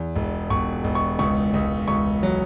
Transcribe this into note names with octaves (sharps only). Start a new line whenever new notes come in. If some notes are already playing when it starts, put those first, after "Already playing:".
Already playing: E2
E1
E1 C#6
E1
C#6
C#2 C#6
C#2
C#2 C#6
F#3